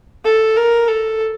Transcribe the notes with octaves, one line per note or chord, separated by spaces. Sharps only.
A4
A#4
A4